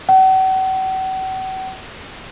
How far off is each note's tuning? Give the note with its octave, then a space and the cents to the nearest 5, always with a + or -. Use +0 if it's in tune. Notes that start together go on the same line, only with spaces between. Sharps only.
F#5 +40